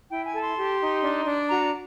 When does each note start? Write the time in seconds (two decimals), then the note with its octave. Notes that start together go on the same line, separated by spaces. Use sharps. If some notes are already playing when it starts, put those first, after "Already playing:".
0.09 E4 G5
0.25 G#5
0.33 A4
0.41 C6
0.56 G4
0.80 D#4
1.03 D4
1.26 D4
1.49 F#4 A#5